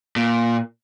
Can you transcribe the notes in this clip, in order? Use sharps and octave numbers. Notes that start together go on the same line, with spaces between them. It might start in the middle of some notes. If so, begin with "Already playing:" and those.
A#2